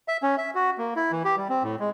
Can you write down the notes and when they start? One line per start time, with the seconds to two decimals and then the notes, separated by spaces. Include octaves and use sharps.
0.08 E5
0.23 C#4
0.38 E5
0.55 F#4
0.78 A#3
0.96 E4
1.12 E3
1.25 G4
1.37 G3
1.49 C4
1.63 A2
1.80 G#3